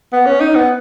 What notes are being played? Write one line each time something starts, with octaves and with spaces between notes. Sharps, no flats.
B3
C#4
D#4
B3